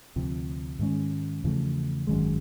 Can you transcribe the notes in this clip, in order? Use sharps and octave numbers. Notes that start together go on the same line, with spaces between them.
D2 C3 F3
G#2 D#3 G#3 C#4
E2 C#3 F3 A3
G#1 F#2 D#3 G#3